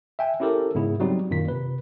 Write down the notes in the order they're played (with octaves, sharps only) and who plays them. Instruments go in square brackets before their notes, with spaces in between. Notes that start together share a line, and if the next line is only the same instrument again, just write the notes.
[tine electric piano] E5 G5 G#5
C#4 E4 G4 A4 A#4
G#2 C#3 B3 E4 G#4
F#3 G3 C4 D#4 F#4
F#2 A#2 D#3 B6
C3 B4